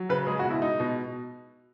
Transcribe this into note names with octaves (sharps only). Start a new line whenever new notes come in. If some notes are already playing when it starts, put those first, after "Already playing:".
Already playing: F#3
C#3 B4
G#3 G#4
F#4
B2
E4
G#3 D#4
B2